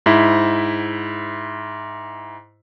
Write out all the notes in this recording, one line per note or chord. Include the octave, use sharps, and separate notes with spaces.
G#2 E4